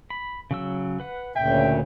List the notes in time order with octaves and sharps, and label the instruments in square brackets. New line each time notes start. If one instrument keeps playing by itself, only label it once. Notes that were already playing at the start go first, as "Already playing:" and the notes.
[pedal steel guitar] B5
C#3 F#3 E6
B4 F#5
[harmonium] D2 A#2 C#3 [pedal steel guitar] E5 [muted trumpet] G5